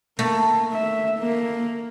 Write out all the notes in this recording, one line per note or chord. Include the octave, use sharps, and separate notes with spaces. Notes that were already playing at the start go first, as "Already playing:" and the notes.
A3 A#3
E5
A#3